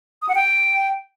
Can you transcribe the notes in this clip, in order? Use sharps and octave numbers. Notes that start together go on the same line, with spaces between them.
D#6
F#5
G5